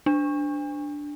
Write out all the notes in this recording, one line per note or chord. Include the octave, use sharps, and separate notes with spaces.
D4